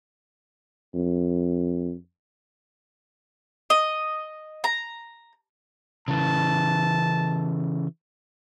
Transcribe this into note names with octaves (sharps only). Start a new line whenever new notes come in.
F2
D#5
A#5
C#3 E3 A5